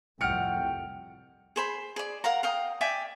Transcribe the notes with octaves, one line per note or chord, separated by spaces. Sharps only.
C2 F2 A2 F#5 G5 F6 C#7 D7
G#4 C5 B5
G#4 D5
A#4 F5 F#5 A#5
F5 G5 D#6
D5 E5 G5 G#5